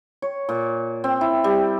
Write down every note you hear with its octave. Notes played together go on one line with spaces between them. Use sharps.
C#5
A#2
C4
E4
G3